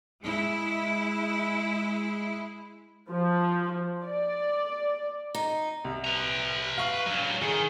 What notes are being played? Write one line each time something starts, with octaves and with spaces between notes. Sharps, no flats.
G#3 E4
F3
D5
D#4
C2
B4 A#5
F5 C#6 C7
G2 F#3
D#3 G#4